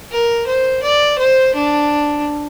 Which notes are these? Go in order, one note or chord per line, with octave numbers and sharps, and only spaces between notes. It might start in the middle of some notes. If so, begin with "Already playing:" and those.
A#4
C5
D5
C5
D4